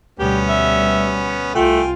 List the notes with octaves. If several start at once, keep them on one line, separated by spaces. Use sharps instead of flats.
D2 B2 G3 B3 C#4 G4
E5
C2 A3 F4 G5 G#5